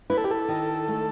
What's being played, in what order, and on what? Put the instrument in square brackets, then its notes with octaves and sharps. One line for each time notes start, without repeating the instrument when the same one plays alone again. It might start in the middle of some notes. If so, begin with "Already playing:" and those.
[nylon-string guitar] E4 [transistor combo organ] B4
[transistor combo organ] A4
G4
A4
[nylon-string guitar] D#3
A3